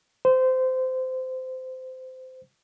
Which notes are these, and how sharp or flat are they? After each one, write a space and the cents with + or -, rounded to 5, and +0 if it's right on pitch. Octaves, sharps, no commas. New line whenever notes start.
C5 -20